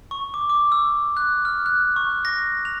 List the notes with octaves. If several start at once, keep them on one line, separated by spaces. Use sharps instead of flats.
C#6
D6
D6
E6
F#6
F6
F#6
C#6
A#6
F7